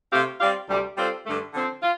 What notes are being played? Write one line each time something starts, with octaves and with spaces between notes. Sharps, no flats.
C3 A3 C4 G4 F5
G3 C4 G4 D5 F5
D2 C3 G3
G3 C4 F4 A4 C5
G2 D3 A3
D3 F3 C4
F4